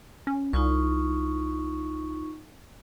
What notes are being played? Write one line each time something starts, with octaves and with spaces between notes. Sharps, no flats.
C#4
C2 D#4 F4 C#6